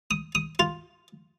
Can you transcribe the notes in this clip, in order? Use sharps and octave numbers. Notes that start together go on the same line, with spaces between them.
D#6
D#6
F4